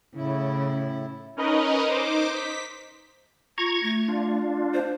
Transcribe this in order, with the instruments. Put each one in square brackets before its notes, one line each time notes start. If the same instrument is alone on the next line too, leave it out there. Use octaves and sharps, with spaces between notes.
[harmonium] A2 E4 [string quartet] C#3
[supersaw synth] C#4 D#4 A#4 B4 D#5
D#4 C5 D6
B6
[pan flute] F4 [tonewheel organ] A#5 C#6 G#6
[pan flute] A3
[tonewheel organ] D4 F4
[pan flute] C5